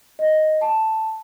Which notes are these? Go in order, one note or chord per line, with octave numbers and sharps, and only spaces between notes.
D#5
A5